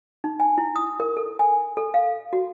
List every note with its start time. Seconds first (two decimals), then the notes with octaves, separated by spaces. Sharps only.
0.24 D#4
0.40 G#5
0.58 E4
0.76 D#6
1.00 A#4
1.17 A4
1.39 G#5
1.77 A4
1.94 F5
2.33 F#4